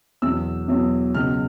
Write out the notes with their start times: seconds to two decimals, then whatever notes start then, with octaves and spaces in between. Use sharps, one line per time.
0.22 E2 B2 F#3 E6
0.68 E2 B2 F#3
1.15 C#2 B2 F#3 F6